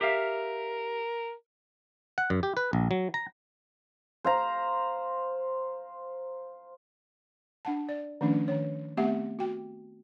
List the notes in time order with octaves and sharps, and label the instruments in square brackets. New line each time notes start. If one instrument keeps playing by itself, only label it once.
[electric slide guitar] G4 E5 F5 [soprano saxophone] A#4
[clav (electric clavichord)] F#5
F#2
G4
B4
A#1
F#3
A#5
[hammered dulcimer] C5 F5 A#5
[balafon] D4 F#5 A5
D5
D#3 F3 A3 C#4 D4
D#3 C#5
A3 B3 C4 G4 E5 F#5
F#4 G5